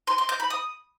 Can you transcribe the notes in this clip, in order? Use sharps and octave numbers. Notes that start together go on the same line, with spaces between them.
C6
C6
G6
B5
D#6